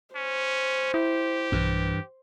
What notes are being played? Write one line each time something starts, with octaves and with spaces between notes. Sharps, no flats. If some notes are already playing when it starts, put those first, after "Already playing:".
C#4 C5
E4 G4
B1 G2 E3